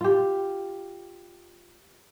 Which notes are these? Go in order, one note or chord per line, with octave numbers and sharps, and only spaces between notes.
F4 G4